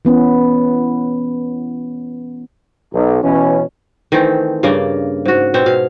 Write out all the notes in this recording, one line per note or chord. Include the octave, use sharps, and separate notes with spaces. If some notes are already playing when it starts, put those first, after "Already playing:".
E3 B3 C#4
B1
B2 E3 C#4
D#3 E3 A3 C4
G2 C#3 A#3 D5
G#2 F#4
B2 C4 C#5
B2 F5